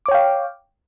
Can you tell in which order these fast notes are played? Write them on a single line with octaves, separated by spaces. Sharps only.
D6 C#5 G5 F5